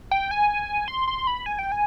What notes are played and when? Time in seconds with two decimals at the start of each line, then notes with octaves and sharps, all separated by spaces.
0.11 G5
0.31 G#5
0.88 C6
1.08 C6
1.27 B5
1.46 G#5
1.59 G5
1.72 G#5